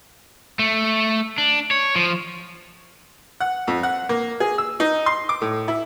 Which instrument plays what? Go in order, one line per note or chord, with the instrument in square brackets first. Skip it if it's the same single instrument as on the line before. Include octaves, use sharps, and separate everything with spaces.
[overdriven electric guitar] A3
D4
C#5
F3
[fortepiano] F#5
F2
F#5
A#3
G#4
E6
D#4
C6
D6
A2
E4